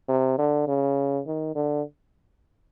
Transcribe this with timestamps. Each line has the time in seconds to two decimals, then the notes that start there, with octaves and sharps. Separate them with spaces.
0.08 C3
0.38 D3
0.67 C#3
1.26 D#3
1.55 D3